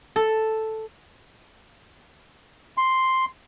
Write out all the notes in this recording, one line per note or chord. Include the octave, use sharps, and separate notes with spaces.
A4
C6